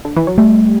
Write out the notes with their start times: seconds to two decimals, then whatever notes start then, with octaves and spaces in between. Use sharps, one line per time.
0.05 D3
0.16 E3
0.27 F#3
0.38 G3 A3